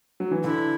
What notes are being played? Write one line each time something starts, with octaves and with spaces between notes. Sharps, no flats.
F#3
E3
D3 E4